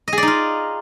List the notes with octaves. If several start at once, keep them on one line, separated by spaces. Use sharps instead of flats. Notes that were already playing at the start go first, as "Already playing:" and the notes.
D#4 F4 G#4 D5 D#5